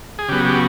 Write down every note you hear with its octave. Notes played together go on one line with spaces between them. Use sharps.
G#4
C#3 F#3 B3 G4
G4